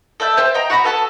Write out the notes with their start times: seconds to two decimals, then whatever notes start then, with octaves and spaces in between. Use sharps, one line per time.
0.20 A4 D5 E5 G6
0.37 C5 G5
0.54 D#5 G5 A#5
0.70 F#4 F#5 A#5 B5
0.84 B3 A4 A5